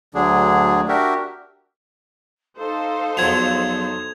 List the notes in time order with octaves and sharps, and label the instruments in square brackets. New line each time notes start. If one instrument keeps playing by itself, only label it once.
[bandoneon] D2 D3 F#3 D4 G#4
D4 F#4 G4 A#4 E5
[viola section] D#4 A4 C5 [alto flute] F5
[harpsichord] E2 F3 F#3 [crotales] G#6 F7